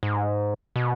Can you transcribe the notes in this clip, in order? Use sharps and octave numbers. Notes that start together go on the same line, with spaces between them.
G#2
B2